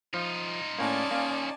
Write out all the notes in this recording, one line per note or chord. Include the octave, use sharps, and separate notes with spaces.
F3 D#4 F4
A2 A#3 C#4 D5 G#5 A5
A#3 C#4 F5